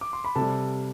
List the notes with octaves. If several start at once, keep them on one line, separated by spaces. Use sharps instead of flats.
D6
C6
B5
C3 A4 A5
G3